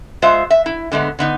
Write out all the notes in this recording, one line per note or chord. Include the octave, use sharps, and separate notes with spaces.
G#3 F4 C5 E5 F5
E5
E4
D3 G#3 A3 B3
D3 B3 D#4